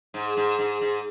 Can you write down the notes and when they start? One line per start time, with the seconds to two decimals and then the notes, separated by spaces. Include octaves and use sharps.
0.14 G#2
0.37 G#2
0.59 G#2
0.81 G#2